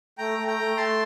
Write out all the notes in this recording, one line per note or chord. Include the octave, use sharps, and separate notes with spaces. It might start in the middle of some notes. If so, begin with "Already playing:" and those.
A3 G5 A#5
A3
G5 A#5
A3
A3 A5 C6